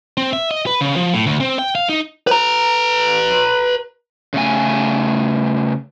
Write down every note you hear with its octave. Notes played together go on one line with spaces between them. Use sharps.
C4
E5
D#5
B4
C#3
F3
A2
D2
C4
G5
F5
D#4
B4 A#5
C#3 A3 G#5